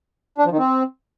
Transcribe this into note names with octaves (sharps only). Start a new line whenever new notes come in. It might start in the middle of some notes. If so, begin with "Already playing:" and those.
D4
F3
D#3
C4